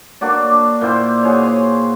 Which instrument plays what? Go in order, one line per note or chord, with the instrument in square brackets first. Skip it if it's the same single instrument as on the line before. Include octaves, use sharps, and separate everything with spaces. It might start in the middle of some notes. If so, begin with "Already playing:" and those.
[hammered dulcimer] A#3 D4 F#4 D5
A#2 E4 C5 G5
F#4 G#4 C#5
C5 C6